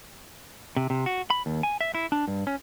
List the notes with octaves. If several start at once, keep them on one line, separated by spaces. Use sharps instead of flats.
C3
C3
F#4
B5
D#2
G#5
E5
E4
D4
G2
C#4